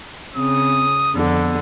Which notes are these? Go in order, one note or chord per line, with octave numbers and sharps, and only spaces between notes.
C#3 C4 D#6
F2 D3 B3